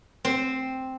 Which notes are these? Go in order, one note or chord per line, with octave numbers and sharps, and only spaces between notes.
C4